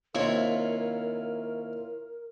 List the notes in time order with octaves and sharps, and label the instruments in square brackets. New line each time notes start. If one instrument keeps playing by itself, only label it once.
[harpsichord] D#2 C3 [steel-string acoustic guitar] E4 F4 C#5 [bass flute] A#4